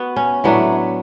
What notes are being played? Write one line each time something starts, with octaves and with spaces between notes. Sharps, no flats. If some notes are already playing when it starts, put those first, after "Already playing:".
Already playing: B3 F#4
C#4
A2 F#3 A3 B3 D4